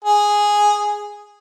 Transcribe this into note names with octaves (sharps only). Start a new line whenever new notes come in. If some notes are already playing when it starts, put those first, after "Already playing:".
G#4